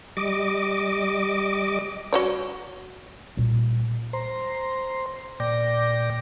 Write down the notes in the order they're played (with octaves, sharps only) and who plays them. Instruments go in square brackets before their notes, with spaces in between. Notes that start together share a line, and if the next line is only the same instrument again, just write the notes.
[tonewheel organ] G3 D#5 D6
[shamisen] F#4 C#5 D5
[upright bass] A#2 G3
[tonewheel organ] C5 A#5 C6
A#2 D5 G5 D6 A#6